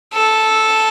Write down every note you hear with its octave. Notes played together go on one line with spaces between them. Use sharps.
A4